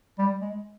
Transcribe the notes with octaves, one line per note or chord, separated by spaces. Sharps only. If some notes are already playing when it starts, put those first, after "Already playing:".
G3
G#3